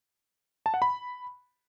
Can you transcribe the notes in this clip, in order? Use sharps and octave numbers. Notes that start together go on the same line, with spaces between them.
A5
F#5
B5